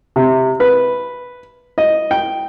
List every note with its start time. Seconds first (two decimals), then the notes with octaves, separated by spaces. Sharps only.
0.16 C3
0.60 B4
1.78 D#5
2.11 G5